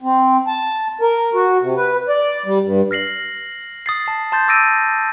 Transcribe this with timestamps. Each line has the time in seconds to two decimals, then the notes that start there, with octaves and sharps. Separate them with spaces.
0.02 C4
0.47 A5
1.01 A#4
1.34 F#4
1.62 C3
1.77 B4
2.09 D5
2.46 G3
2.64 G2
2.91 F6 A#6 C7 F#7
3.86 D#6 A6 C7
4.06 A5 C7
4.32 A5 C6 G6 A6
4.48 D6 E6 A6 A#6 D7 D#7